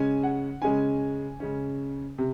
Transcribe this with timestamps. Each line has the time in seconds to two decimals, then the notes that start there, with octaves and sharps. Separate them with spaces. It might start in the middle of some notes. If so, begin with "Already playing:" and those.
Already playing: C#3 G#3 C#4 G#5
0.23 F#5
0.62 C#3 G#3 C#4 G#5
1.40 C#3 G#3 C#4
2.18 C3